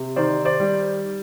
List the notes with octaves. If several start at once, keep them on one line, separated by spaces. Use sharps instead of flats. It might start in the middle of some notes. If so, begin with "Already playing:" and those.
Already playing: C3
D#3 C5 D5
C5 D5
G3